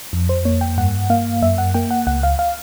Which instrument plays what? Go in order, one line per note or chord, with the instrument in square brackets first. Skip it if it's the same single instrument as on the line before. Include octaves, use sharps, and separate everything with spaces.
[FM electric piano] F2
C5
A#3 C#5
G5
G2 F#5
A#3 F5
F#2 E5
F#5
A#3 G5
F#5
C#2 F#5
F5
F5